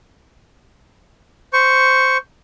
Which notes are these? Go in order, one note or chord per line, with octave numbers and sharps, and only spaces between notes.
C5 C#6